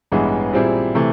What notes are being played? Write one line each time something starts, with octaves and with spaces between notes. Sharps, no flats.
A1 G2 E3 G#3 B3
A#2 G3 C4 E4 G#4
C3 E3 A3